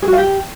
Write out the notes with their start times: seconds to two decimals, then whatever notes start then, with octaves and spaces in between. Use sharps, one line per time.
0.02 G#4
0.08 F#4
0.13 F5
0.18 G4